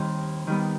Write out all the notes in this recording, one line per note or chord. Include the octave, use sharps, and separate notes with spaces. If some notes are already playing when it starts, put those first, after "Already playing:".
Already playing: D#2 D#3 G3 C4 D#4
D#3 G3 B3